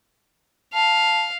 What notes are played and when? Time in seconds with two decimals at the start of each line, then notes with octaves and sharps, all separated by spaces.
0.74 F5 A5